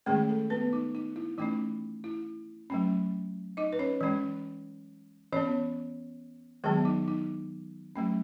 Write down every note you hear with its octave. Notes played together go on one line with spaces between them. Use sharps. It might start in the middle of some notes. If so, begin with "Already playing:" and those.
D#3 G#3 A3 C#4 G#4
A3 A4
B3 B4
D#4
D#4
E4
E3 A3 C#4 D#4
E4
F#3 A3 C#4
D#4 D#5
B4
C#4 C#5
E3 G#3 C#4
E3 B3 C#4 C#5
D#3 F#3 G#3 B3 G#4
D#4
D#4
F#3 A3 C#4